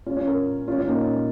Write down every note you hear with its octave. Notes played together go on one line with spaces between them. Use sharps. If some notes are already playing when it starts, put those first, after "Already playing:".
C#4 F4
C#4 F4
F4 A#4
C#4 F4
C#4 F4
A#3 D#4
C#4